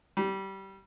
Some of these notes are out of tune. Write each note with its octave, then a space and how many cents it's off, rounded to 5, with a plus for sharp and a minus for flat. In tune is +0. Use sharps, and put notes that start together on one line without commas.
G3 -20